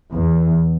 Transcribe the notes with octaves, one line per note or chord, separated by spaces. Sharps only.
E2